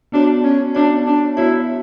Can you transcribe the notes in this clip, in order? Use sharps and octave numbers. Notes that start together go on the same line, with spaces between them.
B3 D4 F#4 C#5
C#4
B3 D4 F#4 C#5
D4
B3 E4 F#4 C#5